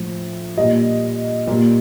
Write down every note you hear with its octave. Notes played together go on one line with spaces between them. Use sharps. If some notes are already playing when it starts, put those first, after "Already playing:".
Already playing: A2 F3
A#2 G3 D#5
A#2 G3